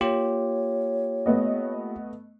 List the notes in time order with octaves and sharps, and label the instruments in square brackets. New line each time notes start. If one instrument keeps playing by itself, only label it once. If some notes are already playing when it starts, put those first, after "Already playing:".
[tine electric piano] A#3 F4 G4 [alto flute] C#5
[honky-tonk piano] A3 B3 D#5